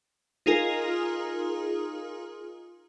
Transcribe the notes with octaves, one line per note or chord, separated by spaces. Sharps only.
D#4 F4 G#4 A#4